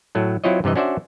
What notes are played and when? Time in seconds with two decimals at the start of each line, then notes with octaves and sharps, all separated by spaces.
0.15 A2 F#3 A3
0.44 F#3 C4 E4 F4 C#5 D#5
0.64 G2 C3 E3 D#5
0.76 C#4 D4 F#4 C5 D5 E5